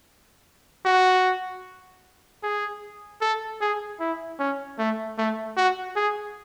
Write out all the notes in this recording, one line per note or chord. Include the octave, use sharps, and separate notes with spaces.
F#4
G#4
A4
G#4
E4
C#4
A3
A3
F#4
G#4